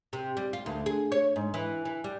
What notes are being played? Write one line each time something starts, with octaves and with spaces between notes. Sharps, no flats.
C3
G3
F4
D2
G#4
C#5
G#2
E3
E3
G3